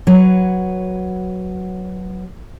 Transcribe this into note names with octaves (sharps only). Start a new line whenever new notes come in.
F#3 F#4 B4 C#5